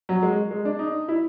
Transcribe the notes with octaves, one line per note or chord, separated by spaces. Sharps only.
F#3
G#3
G#3
D4
D#4
E4